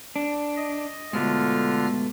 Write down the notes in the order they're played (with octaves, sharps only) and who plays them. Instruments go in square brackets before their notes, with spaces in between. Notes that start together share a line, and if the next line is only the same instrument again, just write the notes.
[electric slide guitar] D4
[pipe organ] D#5
[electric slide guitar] G#2 B2 A3 [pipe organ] D3 F4 F6